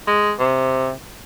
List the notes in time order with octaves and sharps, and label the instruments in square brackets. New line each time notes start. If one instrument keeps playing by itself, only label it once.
[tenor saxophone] G#3
C3